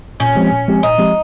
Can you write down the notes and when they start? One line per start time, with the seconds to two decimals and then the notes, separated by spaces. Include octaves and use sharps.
0.20 A#2 C#4
0.35 F3 G#3 C4 G4
0.51 A#2
0.68 F3 G#3 C4 G4
0.83 A#2 D#4
0.99 F3 G#3 C4 G4